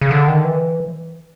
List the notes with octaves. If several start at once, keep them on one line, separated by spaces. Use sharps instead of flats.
C#3
D3
D#3
E3